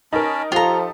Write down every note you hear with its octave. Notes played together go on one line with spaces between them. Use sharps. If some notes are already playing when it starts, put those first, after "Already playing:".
C#4 D#4 A#4 A5 B5
F3 D#4 F4 G4 A4 A#5